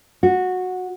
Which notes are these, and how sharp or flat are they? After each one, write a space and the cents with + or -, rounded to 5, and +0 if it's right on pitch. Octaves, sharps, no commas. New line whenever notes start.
F#4 -10